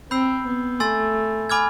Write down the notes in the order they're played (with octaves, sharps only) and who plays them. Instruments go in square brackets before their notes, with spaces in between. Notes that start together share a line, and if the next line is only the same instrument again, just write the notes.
[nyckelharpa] C4 [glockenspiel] B5 E6 G6 C7
[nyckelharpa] B3
[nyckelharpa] A3 [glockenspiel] G#5 C6 E6 A6
[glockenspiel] G#5 B5 D6 F6 G#6